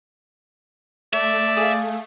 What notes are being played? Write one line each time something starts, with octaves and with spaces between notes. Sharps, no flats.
A3 D5 E5
G#4 F5